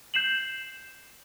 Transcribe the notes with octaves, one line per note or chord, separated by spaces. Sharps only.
G6 C7 E7 F#7